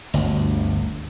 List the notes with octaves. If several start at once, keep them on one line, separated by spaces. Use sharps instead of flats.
G1 D2